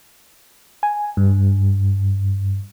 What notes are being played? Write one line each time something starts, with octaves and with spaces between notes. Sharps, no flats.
G#5
G2